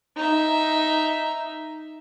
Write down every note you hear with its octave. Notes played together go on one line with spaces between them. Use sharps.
D#4 E5